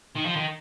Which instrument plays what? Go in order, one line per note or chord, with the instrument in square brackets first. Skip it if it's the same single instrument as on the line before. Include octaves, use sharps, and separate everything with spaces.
[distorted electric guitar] D#3
F3
D#3